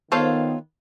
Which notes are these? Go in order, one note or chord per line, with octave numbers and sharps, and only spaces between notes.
D#3 B3 F4 A4 C5 C#5 F5